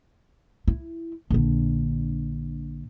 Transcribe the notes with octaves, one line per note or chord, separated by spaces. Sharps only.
E4
A#1 D3